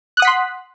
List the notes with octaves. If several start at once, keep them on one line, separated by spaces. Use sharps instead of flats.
F#5 C6 D#6 F#6 B6